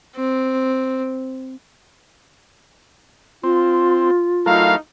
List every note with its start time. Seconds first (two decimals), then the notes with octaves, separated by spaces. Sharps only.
0.16 C4
3.44 C4 F4
4.46 F#3 A3 D#4 E4 A#4 F5